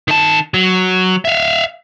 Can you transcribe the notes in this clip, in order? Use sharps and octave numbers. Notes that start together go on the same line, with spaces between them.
D#3 A5
F#3
E5 F5